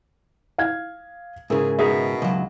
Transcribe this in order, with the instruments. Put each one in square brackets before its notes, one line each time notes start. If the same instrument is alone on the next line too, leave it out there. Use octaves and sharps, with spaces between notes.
[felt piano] F5 G#6
[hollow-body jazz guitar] G#2 C#3 [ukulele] E4 [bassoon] G#4 [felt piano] A#4
[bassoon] B2 [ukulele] D#4 G#4 E5
[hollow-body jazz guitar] C#2 F#3